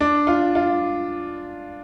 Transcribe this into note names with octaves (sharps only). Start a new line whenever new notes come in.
D4
F4
F4